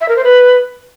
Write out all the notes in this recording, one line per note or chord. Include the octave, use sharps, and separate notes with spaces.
E5
A#4
C5
B4